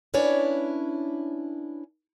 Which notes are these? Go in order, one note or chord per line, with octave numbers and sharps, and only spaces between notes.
C#4 D4 E4 B4 C#5 D5